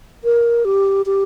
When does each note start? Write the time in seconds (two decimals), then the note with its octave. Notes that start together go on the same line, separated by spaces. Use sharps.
0.24 A#4
0.65 G4
1.06 G4